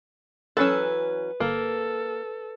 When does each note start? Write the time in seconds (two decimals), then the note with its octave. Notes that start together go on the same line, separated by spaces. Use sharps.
0.57 E3 F#3 C#4 A4 B4 E6
1.40 G1 A#3 A4